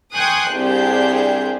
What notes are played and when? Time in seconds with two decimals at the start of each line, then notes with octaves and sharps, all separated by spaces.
0.14 G5 G#5 C6 C#6 D#6 F#6
0.53 C2 D4 G4 G#4 C5 G6